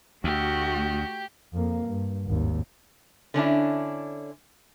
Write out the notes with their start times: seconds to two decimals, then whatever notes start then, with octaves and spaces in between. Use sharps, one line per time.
0.24 D2 A3 F#4 G4
1.53 F2 A#3
1.86 G2
2.26 G#1 D#2
3.34 D3 C#4 D4 E4